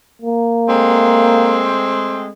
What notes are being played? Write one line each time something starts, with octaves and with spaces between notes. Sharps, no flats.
A#3
G#3 A3 C4